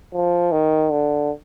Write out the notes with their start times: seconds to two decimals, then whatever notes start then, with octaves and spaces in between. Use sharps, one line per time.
0.14 F3
0.52 D#3
0.91 D3